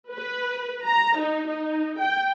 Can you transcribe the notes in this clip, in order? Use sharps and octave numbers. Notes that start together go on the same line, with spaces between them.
B4
A#5
D#4
D#4
G5